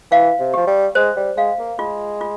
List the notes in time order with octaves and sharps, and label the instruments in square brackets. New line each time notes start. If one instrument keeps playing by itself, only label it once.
[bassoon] E3 [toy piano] F5
[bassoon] C3
[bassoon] F3 [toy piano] G4
[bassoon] G3
[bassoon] G#3 [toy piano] C5
[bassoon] G3
[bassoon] G#3 [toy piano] F5
[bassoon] A#3
[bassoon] G#3 [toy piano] F4
[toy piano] F4